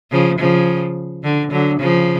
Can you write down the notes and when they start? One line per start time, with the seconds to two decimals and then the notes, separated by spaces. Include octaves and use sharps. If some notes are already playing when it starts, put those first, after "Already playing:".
0.11 C#3 F3
0.39 C#3 F3
1.24 D3
1.51 D3 F#3
1.80 C#3 F3